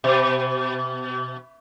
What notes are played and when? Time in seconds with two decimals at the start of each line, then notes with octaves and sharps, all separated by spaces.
0.04 B2